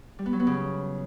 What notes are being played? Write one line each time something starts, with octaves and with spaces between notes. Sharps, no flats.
G3
B3
F#3
B3
C#3